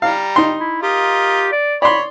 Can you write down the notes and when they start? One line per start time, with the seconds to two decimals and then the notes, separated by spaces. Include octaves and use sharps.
0.02 G3 F5 A#5
0.36 D#4 C6
0.60 E4
0.83 F4 G4 A#4 D#5
1.52 D5
1.82 C#5 D5 B5 C6